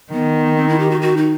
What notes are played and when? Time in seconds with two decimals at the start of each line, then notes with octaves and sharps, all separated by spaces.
0.12 D#3 B3
0.57 C4
0.69 E4
0.79 G4
0.91 F#4
1.02 F#4
1.17 D#4